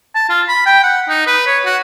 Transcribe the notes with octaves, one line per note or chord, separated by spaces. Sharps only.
A5
F4
B5
G5
F#5
D#4
B4
C#5
F#4